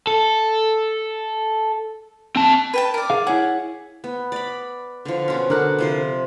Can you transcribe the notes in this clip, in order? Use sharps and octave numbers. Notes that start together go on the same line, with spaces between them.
A4
C4 A5
B4 G5 A5
A#4 D5
G#4 F5
E4 G#4 C#5 F#5
B3
D5 B5
D3 F3
B2 C#4
D3 D4 F#4 A#4 F#6
C3 F3 C5